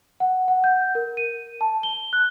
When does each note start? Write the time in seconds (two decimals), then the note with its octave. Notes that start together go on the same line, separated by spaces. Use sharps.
0.20 F#5
0.48 F#5
0.64 G6
0.95 A#4
1.17 D#7
1.61 A5
1.83 G7
2.13 F#6